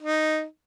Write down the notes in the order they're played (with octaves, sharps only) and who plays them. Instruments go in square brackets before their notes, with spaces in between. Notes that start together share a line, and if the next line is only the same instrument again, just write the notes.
[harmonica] D#4